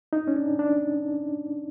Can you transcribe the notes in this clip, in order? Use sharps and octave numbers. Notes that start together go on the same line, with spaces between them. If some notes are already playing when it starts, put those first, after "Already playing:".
D#4
C#4
D4
D4